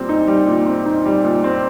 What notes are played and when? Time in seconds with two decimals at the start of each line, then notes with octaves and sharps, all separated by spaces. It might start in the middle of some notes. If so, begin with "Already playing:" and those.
Already playing: A#2 G3 C4
0.09 D#4
0.27 G3
0.47 A#2
0.66 C4
0.86 D#4
1.05 G3
1.24 A#2
1.44 C4